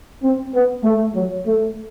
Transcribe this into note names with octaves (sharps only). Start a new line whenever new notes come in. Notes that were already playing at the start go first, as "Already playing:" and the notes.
C4
B3
A3
F#3
A3